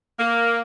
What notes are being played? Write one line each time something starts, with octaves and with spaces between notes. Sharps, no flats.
A#3